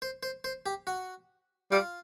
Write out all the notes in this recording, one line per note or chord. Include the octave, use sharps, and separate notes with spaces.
C5
C5
C5
G4
F#4
G3 F4